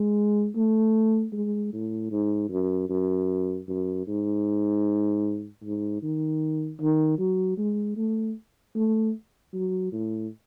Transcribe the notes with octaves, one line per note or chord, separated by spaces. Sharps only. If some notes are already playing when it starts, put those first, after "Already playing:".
Already playing: G#3
A3
G#3
A2
G#2
F#2
F#2
F#2
G#2
G#2
D#3
D#3
F#3
G#3
A3
A3
F#3
A2